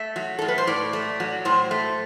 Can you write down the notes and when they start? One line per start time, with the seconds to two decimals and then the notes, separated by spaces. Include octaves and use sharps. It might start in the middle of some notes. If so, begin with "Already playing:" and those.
Already playing: A3 E5
0.16 F#3
0.39 A2 A4
0.48 B4
0.58 C5
0.67 A2 D5
0.93 A3
1.20 F#3
1.45 A2 C5
1.71 A3